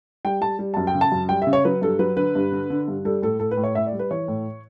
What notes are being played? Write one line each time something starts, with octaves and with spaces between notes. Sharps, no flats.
G3 G5
G3 A5
G3
F#2 A5
G5
C#3
A5
F#2
G3 G5
E5
C#3
C#5
F#3 B4
G2 A4
F#3 B4
D3 B4
G2
D3
D3
G2
G3 A4
A2 A4
A2 A4
B4
A2
C#5
A2 E5
D5
G3
B4
E3 C#5
A2